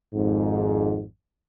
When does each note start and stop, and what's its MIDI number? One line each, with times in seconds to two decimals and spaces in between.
0.14 1.04 32
0.14 1.04 41
0.14 1.04 44